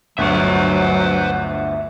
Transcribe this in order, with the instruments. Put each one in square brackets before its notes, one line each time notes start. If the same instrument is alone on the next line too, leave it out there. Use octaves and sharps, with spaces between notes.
[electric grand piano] G1 D2 C#6 [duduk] F#3 [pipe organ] B4 C5 [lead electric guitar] E5 F#5